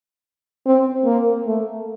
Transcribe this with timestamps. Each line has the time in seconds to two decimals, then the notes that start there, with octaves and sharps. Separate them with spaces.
0.66 C4
1.05 A#3
1.46 A3